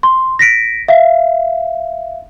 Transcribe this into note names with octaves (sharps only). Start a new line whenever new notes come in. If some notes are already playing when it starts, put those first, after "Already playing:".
C6
A#6 B6 D7
E5 F5